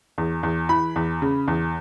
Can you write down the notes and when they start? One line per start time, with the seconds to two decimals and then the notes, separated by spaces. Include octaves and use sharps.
0.18 E2
0.43 E2
0.69 E3 B5
0.96 E2
1.22 C#3
1.48 E2